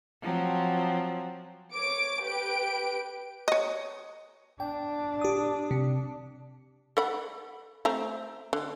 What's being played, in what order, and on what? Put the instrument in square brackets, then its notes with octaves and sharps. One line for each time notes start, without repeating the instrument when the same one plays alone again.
[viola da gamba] F3 F#3 C4
[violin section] C#5 D6 D7
G4 B4 D7
[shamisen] C#5 D#5
[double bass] D4 [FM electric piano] G5
[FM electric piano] G4 D#6
C3
[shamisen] A4 F#5 B5
A3 C4 A#5
D3